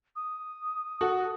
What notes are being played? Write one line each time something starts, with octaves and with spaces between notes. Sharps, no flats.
D#6
F#4 A4
D#6